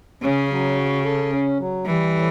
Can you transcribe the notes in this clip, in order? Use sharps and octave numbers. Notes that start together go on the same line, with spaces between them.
C#3 C#4
F#3
F#4
A4
C#4
F#3
E3 G3
A2